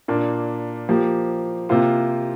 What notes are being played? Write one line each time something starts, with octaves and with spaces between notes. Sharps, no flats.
A#2 A#3 D4
F3 A#3 G4
C3 A#3 F4 C5